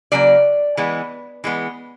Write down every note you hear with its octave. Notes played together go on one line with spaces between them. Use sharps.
C#3 F#3 A#3 D5
E3 G#3 B3
E3 G#3 B3